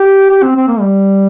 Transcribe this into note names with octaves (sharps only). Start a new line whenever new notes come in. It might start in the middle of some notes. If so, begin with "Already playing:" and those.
Already playing: G4
G4
C4
C4
A#3
G3